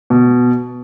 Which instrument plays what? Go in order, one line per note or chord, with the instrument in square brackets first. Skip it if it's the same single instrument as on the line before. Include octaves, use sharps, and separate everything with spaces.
[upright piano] B2